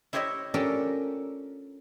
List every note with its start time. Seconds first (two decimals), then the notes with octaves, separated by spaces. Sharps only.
0.13 E4 G4 C5 C#5 D#5 E5
0.54 C#4 D4 F4 G4 A4 A#4